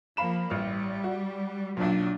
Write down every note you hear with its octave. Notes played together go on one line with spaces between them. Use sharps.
F3 A#3 F5 B5 E7
A1 G3 F6
F#4
B1 A#2 F#3 D4